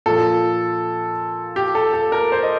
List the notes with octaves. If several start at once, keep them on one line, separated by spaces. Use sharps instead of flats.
A#2 F3 A4
G4
A4
A4
A#4
C5
D#5